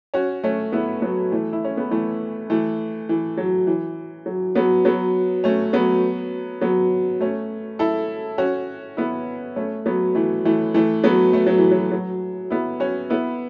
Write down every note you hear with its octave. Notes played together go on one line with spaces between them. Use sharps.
C#4 F#4
A3 C#4
B3 E4
F#3 B3
E3 A3
E4
C#4
B3
E3 A3
E3 A3
E3
F#3
E3
F#3
F#3 B3
F#3 B3
A3 C#4
F#3 B3
F#3 B3
A3 C#4
E4 A4
C#4 F#4
B3 E4
A3 C#4
F#3 B3
E3 A3
E3 A3
E3 A3
F#3 B3
A3
F#3
E3
F#3
F#3
B3 E4
C#4 F#4
B3 E4